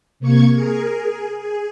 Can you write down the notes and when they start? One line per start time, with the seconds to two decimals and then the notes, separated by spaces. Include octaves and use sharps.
0.20 C3 A#3 C#6 G#6
0.55 G#4 A#4
1.03 G#4
1.38 G#4